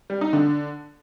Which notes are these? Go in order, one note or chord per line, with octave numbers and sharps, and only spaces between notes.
G3
D#4
D3